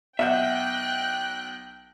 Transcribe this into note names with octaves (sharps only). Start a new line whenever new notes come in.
B1 E5 F#5 G5 F#6 G6